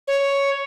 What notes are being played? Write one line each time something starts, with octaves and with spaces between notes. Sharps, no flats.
C#5